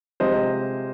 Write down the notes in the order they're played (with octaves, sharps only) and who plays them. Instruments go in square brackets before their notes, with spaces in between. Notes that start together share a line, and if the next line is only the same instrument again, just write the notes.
[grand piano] C3 F3 G#3 C5 D#5